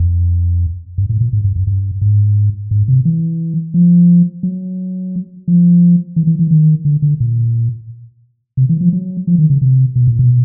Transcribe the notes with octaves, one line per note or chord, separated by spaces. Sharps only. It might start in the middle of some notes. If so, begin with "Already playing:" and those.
Already playing: F2
G2
A2
A#2
G#2
G2
F#2
G2
G#2
G#2
C3
E3
F3
F#3
F3
E3
E3
E3
D#3
D3
D3
A#2
C3
E3
F3
F#3
F3
D#3
C#3
C3
B2
A#2
B2